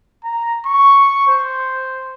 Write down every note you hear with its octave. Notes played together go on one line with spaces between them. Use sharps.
A#5
C#6
C5